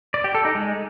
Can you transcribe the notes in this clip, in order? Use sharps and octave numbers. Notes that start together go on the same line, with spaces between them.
D5
G4
A4
D#4
G#3